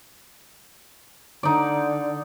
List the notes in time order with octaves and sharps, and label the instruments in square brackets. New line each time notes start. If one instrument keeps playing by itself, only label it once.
[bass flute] D3 [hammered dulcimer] D#4 D5